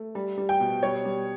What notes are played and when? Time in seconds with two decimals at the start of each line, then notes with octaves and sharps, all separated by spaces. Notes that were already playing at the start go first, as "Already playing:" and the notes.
Already playing: A3
0.15 G3
0.38 G3
0.49 G5
0.60 B2
0.82 G3 C#5
1.05 G3